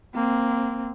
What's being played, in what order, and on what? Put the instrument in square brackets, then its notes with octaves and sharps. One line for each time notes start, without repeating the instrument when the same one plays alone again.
[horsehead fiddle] A#3 C4